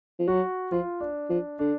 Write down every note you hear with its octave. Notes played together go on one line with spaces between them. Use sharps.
F3
F#3 F#4
F3 F4
D4
F3 D4
D3 D4